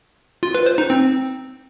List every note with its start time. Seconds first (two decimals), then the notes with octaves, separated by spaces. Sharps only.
0.43 F4
0.55 B4
0.66 C5
0.78 D#4
0.90 C4